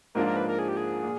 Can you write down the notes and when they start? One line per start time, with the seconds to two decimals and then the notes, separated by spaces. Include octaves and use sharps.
0.15 G#2 F3 A#3 D4 F4 A#4
0.26 A#4
0.37 B4
0.48 A#4
0.59 G#4
0.68 G4
0.77 G#4
1.03 A#2